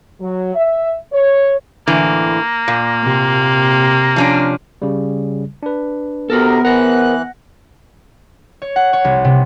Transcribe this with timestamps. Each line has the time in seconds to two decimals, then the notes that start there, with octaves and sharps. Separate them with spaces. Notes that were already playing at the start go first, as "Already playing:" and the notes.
0.20 F#3
0.55 E5
1.12 C#5
1.87 A2 D3 E3 A#3
2.68 A#2
3.03 C3
4.16 F3 C#4 D4
4.82 C#3 G3
5.63 D4 B4
6.30 C3 B3 F#4 A4 A#4
6.65 E3 A#4 C5 F#5 F#6 A#6
8.62 C#5
8.76 F#5
8.93 C#5
9.04 C2
9.24 C3